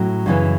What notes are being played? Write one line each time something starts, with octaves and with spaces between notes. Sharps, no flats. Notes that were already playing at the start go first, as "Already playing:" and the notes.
Already playing: A2 F#3 C#4
F#2 C#3 E3 C#4